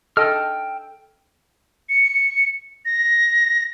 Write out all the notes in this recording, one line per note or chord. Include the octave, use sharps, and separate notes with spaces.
A4 D#5 G5 E6 F6
C#7
A#6